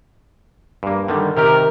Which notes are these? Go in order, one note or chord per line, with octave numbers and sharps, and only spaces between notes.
G2 A#3
D3 D#3 G3
C3 D#3 G4 A#4